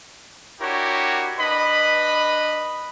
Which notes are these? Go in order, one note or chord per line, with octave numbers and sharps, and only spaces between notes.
D4 E4 F#4 G4 A#4 C#5
D4 B4 D#5 B5